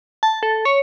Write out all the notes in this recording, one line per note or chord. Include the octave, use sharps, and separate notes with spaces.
A5
A4
C#5